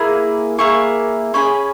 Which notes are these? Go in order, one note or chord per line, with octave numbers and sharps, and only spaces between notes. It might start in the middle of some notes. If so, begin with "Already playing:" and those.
Already playing: A#3 E4 G#4
A#3 E4 G#4 C#6
C#4 E4 G#4 B5